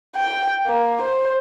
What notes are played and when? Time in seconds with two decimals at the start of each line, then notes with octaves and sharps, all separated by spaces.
0.16 G5
0.67 A#3
1.02 C5